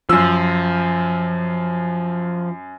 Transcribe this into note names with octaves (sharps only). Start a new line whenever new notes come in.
F#2 F3 E6